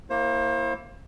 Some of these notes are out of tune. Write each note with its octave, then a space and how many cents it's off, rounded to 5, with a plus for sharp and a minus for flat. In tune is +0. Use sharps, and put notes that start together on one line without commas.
A#3 +0 E4 +0 C5 +35